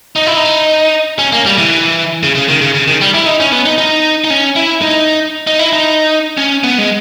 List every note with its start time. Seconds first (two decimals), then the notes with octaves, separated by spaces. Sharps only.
0.16 D#4
0.27 E4
0.37 D#4
1.19 C#4
1.32 A#3
1.46 G3
1.58 E3
2.23 C#3
2.36 C#3
2.49 D#3
2.61 C#3
2.74 C#3
2.88 D#3
3.01 G3
3.14 E4
3.26 D#4
3.40 C#4
3.52 B3
3.65 D#4
3.78 D#4
4.24 D#4
4.30 C#4
4.56 E4
4.82 D#4
5.47 D#4
5.59 E4
5.73 D#4
6.37 C#4
6.64 B3
6.78 G#3